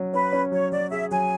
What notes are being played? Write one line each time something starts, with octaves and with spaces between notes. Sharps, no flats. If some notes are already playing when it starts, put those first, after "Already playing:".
Already playing: F#3 C#4
C#4 B4
C#4
F#3 C#5
F#3 D5
G#4 E5
F#3 G#5